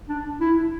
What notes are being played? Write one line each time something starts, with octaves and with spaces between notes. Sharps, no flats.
D4
E4